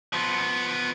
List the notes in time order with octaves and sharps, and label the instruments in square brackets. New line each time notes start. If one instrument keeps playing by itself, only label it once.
[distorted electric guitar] F3 B3